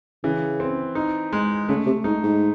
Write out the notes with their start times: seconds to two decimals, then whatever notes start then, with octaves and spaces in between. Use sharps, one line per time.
0.24 C#3 E3
0.60 C4
0.95 D#4
1.33 G#3
1.69 C#3 A3
1.86 C3
2.04 G#2 D#4
2.23 G#2